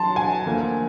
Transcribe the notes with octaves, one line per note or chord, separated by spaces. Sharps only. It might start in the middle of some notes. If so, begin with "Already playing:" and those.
Already playing: F#3 A5 C6
G#5
D2 D3 F3 A#3